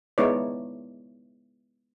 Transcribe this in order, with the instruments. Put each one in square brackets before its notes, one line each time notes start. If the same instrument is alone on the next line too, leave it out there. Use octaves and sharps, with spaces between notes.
[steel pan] G#3 B3 D#4 E4 C#5 D5